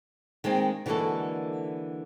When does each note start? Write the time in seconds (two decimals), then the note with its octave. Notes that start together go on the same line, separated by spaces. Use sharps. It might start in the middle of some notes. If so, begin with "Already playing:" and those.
0.44 D#3 G#3 A#3 C4
0.86 D3 E3 G#3 A#3 F#4 A4